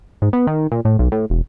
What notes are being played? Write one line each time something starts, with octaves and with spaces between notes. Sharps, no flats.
G#2
B3
D#3
A#2
A2
B1
A2
E1